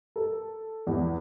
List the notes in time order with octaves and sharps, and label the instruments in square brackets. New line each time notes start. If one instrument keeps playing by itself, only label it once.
[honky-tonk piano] A4
E2